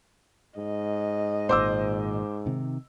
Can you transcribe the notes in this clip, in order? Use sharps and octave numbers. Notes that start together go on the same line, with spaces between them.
G#2 D#5
G#1 A#2 C5 D6 E6
C3 D#3